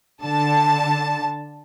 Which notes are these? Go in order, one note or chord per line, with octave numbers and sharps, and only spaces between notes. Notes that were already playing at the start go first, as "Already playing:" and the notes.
D3 A5